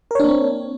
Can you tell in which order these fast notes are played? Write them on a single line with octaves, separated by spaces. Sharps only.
A#4 C#5 D4 A#3 C4